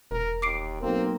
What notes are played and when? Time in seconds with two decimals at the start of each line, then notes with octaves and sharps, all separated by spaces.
0.11 E1 A#4
0.42 D#2 D6 C7 D7
0.82 B1 A#3 C4